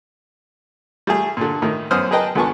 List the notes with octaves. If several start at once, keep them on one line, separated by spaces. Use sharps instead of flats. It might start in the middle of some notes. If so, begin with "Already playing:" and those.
G3 A3 G#4
A#2 D3
A2 D#3
F#2 B3 C#4 C5 D#6 F6
G#4 A#4 B4 D#5 G5 A5
C#2 D3 B3 G#5 A5 C#6